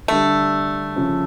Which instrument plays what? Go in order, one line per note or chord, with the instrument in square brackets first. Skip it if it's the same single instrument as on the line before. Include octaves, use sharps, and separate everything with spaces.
[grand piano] D3 G3 D4 [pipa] A3
[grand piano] C#3 F3 C#4